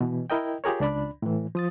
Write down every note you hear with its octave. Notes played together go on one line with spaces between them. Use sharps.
B2 E3
E4 A#4 D#5 G5
F4 G4 G#4 A#4 C#5
C#2 D4 D5 B5
A2 E3
F3 D#6 A6